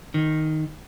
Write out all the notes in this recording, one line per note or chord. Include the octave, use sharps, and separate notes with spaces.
D#3